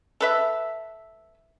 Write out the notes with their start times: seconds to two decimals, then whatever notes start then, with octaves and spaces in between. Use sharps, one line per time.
0.21 A4 B4 E5